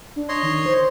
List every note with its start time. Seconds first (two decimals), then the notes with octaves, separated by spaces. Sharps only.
0.16 D4
0.29 C#5 D#5 C6
0.43 D#3
0.66 C5